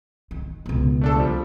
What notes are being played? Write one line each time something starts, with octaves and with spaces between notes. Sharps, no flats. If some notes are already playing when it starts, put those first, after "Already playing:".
D#3
C#2 B2
A3 D4 A4
F3 G3